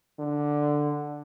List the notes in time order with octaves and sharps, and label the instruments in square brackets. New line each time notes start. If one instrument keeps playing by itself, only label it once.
[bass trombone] D3